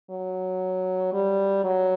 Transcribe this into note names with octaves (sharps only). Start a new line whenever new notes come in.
F#3
G3
F#3